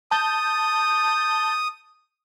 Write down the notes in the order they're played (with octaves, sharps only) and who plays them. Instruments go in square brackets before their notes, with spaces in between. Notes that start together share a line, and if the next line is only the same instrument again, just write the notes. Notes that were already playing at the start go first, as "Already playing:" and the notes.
[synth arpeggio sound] A5 G6 [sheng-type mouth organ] D#6